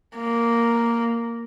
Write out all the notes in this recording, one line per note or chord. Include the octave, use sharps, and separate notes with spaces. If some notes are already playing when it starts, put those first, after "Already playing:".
A#3